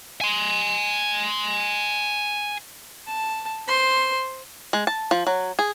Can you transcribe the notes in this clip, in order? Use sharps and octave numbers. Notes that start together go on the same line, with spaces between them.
G#5 C6
A5
C5 C6
G#3
A5
F3
F#3
G#4